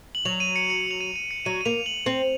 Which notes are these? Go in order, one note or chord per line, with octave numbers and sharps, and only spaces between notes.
F#7
F#3 F7
D#7
C#7
C#7
F7
D#7
D#7
C#7
F#3 D#7
D#7
A#3 F7
F#7
C4 F#7